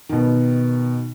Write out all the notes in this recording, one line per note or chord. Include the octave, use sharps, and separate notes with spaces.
B2 D#3